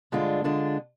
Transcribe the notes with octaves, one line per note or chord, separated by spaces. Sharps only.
G2 D3 G#3 D4 F4
D3 G#3 D4 F4